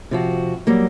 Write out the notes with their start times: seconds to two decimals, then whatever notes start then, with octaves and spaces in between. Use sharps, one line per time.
0.11 C3 F3 F#4
0.67 F#3 G3 A#3